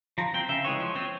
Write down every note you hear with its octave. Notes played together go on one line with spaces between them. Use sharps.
F3 A#5
C4 G5
C#3 E5
E3 G#3 C#5
F3
C4